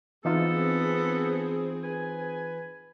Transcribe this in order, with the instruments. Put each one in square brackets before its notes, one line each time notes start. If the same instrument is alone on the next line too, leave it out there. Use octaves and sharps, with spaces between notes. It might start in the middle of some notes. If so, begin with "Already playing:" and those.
[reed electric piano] E3 D#4 F4 [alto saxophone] B3 [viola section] C4 G#4 [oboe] A4
[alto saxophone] B4 [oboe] G#5